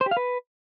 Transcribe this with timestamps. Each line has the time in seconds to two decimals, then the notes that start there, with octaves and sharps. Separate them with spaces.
0.01 C5
0.06 G4
0.11 F5
0.17 B4